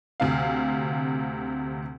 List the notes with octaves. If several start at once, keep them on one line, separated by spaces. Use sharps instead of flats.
D2 C3 F5